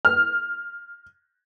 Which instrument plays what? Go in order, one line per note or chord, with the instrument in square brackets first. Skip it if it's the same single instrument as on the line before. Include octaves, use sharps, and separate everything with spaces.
[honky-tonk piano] F6